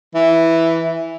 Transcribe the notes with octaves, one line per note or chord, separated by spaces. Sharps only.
E3